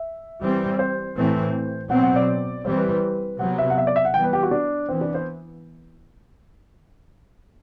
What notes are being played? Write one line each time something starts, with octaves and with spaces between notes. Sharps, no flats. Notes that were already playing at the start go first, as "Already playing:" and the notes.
Already playing: E5
E3 G3 C4
C5
A2 E3 A3 C4
B2 F#3 C4 F#5
F#5
D5
E3 G3 C4 C5
B4
B4
C3 F#3 B3 F#5
E5
F#5
E5
D5
E5
F#5
E3 G3 B3 G5
B4
G4
F#4
D4
E3 B3 C4
D4
C5